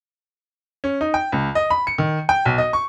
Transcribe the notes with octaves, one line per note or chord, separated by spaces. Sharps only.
C#4
D#4
G5
C#2
D#5
B5
C#7
D#3
G5
B1
D#5
C#6